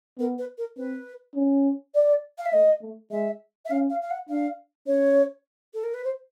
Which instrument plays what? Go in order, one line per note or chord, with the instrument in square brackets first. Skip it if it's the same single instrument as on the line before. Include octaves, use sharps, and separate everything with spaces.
[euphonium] B3 [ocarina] A#4
[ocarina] B4
A#4
[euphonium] C4 [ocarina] B4
[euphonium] C#4
[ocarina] D5
F5
E5
[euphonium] A3 [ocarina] D#5
[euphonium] A3
[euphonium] G#3 [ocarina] E5
[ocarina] E5
[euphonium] C#4 [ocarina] F5
[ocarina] F5
F5
F#5
[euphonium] D4 [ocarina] F5
[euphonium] C#4 [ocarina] C#5
[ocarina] A4
A#4
B4
C5